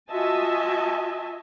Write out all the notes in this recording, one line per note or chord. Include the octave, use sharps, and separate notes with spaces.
F4 F#4 D#5 E5 G#5 A5